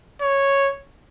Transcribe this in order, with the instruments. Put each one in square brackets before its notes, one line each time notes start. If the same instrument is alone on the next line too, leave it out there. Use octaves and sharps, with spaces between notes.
[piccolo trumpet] C#5